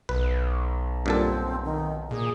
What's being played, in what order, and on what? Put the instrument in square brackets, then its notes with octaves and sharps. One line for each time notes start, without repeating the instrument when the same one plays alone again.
[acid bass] B1 [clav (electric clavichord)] B4
[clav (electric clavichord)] G2 A#2 A4 [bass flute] C4
[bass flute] D#3
[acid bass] A#2 [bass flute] G#4